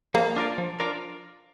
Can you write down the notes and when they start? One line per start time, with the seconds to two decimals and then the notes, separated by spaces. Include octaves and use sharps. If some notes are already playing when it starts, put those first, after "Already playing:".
0.14 F3 A#3
0.37 D4 F4 A#4 D5
0.58 F3
0.80 D4 F4 A#4 D5